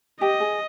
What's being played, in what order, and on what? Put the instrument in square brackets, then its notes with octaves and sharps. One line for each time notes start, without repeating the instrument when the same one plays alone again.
[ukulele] G4 [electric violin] D#5
[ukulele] G#4